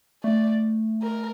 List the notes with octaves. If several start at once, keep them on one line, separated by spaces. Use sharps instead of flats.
A3 D5
A#4